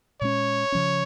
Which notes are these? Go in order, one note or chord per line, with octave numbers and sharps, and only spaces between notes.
A#2 G#3 C#4 C#5
C#3 F3 C#4